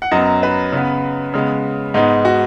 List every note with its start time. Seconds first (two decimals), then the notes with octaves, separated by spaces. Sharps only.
0.02 F#5
0.11 F#2 F#3 B3 D#5
0.43 B4
0.72 C#3 B3
1.34 C#3 G#3 B3
1.94 G#2 G#3 B3 D#4
2.25 F#4